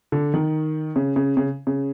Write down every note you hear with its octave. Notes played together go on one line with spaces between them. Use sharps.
D3
D#3
C#3
C#3
C#3
C#3